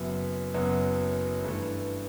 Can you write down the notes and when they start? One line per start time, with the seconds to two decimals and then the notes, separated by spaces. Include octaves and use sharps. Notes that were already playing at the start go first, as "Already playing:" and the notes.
Already playing: F#1 F#2 F#3 B3 E5
0.54 F#1 F#2 F#3 B3
1.44 G2 E3 A3